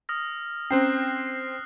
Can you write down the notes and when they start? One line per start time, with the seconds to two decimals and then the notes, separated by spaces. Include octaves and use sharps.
0.09 D#6 F6 A#6
0.71 C4 C#4 C5 G5 F#6 C7